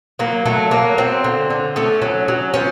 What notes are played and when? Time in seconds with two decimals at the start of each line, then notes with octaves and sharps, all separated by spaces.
0.19 F#3 A#3
0.45 F#3 A3
0.71 F#3 A#3
0.98 F#3 C4
1.24 D3
1.50 D3
1.76 A3 C#4
2.02 F#3
2.28 F#3
2.54 F3 C#4